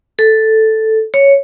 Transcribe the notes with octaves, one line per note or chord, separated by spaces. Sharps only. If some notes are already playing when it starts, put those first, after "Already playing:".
A4
C#5